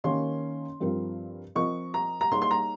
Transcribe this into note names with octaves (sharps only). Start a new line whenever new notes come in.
D#3 A#3 C#4 G4 C#5 C6
G2 F3 C4 F4 A#4
F3 C4 F4 A#4 D#5 C#6
A#5
A#5
G3 A#3 D#4 G#4 C#5 C6
C6
A#5